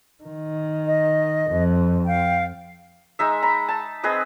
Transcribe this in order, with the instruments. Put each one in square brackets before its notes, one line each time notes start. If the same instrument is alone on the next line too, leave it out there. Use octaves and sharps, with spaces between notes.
[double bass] D#3
[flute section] D#5
[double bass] F2
[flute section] F5 G5
[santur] G#3 D#4 E5
A#5 B5
A5
C4 G#4 B4 D#5